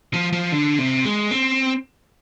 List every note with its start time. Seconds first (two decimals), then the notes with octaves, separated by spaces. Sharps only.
0.14 F3
0.33 F3
0.52 D3
0.78 C3
1.05 G#3
1.31 C4